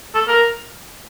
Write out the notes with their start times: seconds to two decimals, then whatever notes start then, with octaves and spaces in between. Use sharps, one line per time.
0.15 A4
0.28 A#4